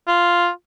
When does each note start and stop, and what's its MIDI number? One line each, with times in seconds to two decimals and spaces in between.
0.08 0.48 65